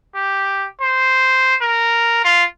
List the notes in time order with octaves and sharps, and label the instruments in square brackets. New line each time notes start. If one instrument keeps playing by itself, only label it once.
[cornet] G4
C5
A#4
F4